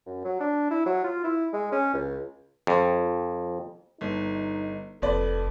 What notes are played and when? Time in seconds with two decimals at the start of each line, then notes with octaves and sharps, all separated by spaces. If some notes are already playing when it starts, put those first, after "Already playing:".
0.06 F#2
0.24 F#3
0.40 D4
0.71 E4
0.86 F#3
1.04 F4
1.24 E4
1.53 G#3
1.72 C#4
1.94 C#2
2.67 F2
4.01 G1 D#4
5.02 F1 F2 A4 B4 D5